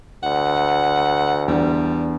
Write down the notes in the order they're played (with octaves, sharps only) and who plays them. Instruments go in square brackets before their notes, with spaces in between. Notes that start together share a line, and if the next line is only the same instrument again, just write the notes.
[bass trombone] D2 [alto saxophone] F#5
[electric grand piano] E2 D4 [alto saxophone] G3